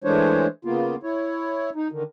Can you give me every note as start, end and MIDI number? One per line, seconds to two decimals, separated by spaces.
0.04 0.47 52
0.04 0.47 56
0.04 0.47 57
0.04 0.47 62
0.04 0.47 72
0.04 0.47 73
0.65 0.96 49
0.65 0.96 58
0.65 0.96 59
0.65 0.96 65
1.03 1.70 64
1.03 1.70 73
1.75 1.88 63
1.92 2.03 50
1.92 2.03 51